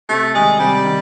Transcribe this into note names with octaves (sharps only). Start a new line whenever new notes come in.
C3 A3
D#3 G3 G#3
C3 G3
D#3